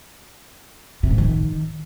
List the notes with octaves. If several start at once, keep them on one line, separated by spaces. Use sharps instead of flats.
C3
G#2
D#3